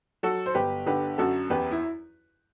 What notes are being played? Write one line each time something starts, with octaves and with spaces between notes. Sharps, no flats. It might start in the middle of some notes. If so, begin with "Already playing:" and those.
F#3 F#4 A4
C5
G1 G4 B4
D3 G4 B4
F#2 F#4 A4
E2 G4 B4
E4